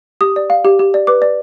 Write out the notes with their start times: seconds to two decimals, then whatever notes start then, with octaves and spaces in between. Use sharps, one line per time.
0.21 G4 D#6
0.36 D5
0.50 F5
0.65 G4
0.79 G4
0.94 D5
1.07 B4 D6
1.22 D5